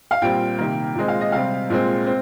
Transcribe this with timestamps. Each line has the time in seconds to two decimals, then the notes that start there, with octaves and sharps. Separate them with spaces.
0.11 F5
0.22 A#2 G3 C4 G5
0.58 C3 D#3 A#3
0.95 A#2 G#3 C4 D#5
1.08 F5
1.21 D#5
1.32 C3 G3 C4 F5
1.70 A#2 G#3 C4
2.07 C4